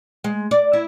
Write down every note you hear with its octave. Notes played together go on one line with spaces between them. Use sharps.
G#3
D5
E4